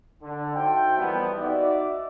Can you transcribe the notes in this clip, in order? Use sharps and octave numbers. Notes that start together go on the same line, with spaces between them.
D3
D#4 F#4 A4 C5 E5 G5
A2 E3 F3 G3 A#3 B3
D#4 F#4 D5 E5